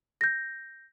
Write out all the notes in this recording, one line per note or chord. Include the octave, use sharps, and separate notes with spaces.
G6 A#6